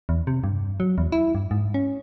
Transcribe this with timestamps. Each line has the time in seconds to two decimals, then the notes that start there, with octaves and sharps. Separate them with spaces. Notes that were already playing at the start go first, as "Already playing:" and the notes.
0.09 E2
0.27 C3
0.44 G2
0.80 F#3
0.98 E2
1.12 E4
1.35 G2
1.51 G#2
1.74 C#4